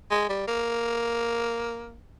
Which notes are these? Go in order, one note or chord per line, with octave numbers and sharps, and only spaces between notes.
G#3
G3
A#3